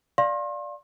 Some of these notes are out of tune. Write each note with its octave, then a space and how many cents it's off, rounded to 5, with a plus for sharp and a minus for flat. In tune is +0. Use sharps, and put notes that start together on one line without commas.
D5 +0 F5 +0 C6 +40